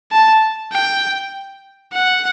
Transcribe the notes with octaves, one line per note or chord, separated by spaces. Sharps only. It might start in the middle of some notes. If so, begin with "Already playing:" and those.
A5
G5
F#5